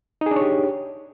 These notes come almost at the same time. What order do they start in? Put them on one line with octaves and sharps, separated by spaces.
D#4 G#4 D4 C#5 G4